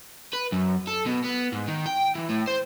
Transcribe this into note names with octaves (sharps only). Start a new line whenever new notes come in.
B4
F#2
A4
B2
B3
G#2
D#3
G5
E3
A2
C5